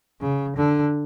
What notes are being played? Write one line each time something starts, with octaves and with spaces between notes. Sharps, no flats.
C#3
D3